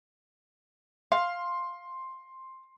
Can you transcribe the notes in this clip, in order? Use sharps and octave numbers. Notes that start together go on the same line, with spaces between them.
F5 C6